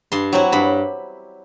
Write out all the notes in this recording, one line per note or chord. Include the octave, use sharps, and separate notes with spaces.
G2 C6
F#3 C4 E4
G2 B5